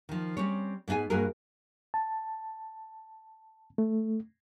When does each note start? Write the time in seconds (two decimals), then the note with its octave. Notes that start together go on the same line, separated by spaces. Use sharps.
0.09 D#3 F3
0.37 G3 C4 C#4 C#5
0.88 G#2 B3 D#4 G#4 G#5
1.10 G2 A#3 F#4 G#4 A#4
1.94 A5
3.78 A3